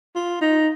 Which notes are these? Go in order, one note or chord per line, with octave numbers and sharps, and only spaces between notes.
F4
D#4